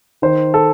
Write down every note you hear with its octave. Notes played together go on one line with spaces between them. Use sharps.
D#3 C5
A4